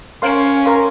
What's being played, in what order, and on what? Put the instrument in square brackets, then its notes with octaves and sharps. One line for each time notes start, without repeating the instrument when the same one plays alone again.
[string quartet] C#4 [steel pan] A#4 F5 C6
[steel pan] A#4 F5 C6